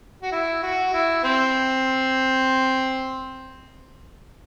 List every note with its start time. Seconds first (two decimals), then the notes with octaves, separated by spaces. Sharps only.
0.22 F#4
0.32 E4
0.63 F#4
0.93 E4
1.24 C4